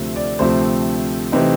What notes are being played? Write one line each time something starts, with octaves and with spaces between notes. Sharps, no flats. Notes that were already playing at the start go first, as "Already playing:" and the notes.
Already playing: D2 C3 F3 A3 C4
D5
D2 C3 F3 A3 C4 C5
C3 E3 A3 C4 D#4